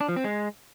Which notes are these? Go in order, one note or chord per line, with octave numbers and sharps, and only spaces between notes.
D4
F3
C4
G#3